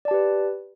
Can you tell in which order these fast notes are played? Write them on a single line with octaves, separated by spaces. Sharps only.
D5 A5 G4 B4